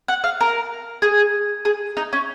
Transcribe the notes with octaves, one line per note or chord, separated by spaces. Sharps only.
F#5
F5
A#4
G#4
G#4
D#4
C#4